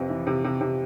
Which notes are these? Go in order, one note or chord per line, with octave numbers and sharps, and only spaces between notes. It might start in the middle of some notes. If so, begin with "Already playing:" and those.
Already playing: F2 C3 B4
E3
C3
C3
C3